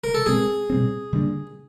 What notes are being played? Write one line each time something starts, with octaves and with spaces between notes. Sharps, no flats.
A#4
A4
B2 G#3 C4 G#4
B2 G3 C4
D3 G3 A#3 D4